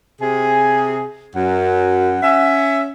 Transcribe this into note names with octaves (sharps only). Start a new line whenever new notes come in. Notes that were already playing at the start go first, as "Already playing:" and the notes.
C3 G#4 G#5
F#2 F#5
C#4 E5